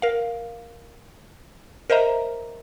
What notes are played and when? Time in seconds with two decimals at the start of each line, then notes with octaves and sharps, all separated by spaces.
0.02 A#4 F5
1.90 A#4 C5 D#5 E5 A#5